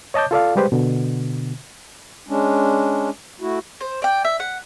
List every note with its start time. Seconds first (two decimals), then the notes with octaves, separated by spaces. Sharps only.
0.14 C#5 D#5 A5 D6 G6
0.31 F4 A4 D5 F5
0.56 G3 G#3 G4 B4 C5
0.72 B2 D3
2.29 G#3 C#4 D4
3.41 A3 E4 F#4
3.81 C5
4.02 D5 G5
4.25 E5
4.40 F#5